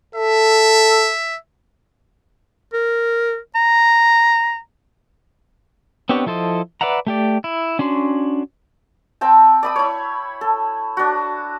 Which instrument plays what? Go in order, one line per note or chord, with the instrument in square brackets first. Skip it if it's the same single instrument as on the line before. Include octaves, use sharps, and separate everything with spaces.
[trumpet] A4 [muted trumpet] E5
[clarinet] A#4
A#5
[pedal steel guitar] B3 C4 D4 G4 C#5
F3 E4 A4 C5 D#5
B4 D5 E5 F#5 A#5
A3 G4 D5
E4
C#4 D4 F#4 C6
[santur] C4 G5 A5
D5 B5 D#6
E4 C#5
A4
D4 F#4